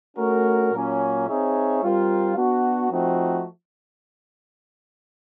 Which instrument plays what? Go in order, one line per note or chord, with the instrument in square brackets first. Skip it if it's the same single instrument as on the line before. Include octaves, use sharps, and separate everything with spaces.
[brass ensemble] A3 C#4 F#4 A#4
A#2 F#3 A#3 C#4
C4 D#4 G#4 C#5 E5
G3 C4 F4 A#4
B3 D4 F#4
F3 A3 C4 D#4 F#4